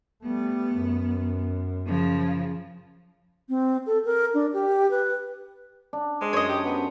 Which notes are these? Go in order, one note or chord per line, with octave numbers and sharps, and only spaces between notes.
G3 A3 B3
F#2
C#3 F3
C4
A4
A#4
D4
G4
B4
D4
G#3 C5
F#2 C#5 D#5
G4
B3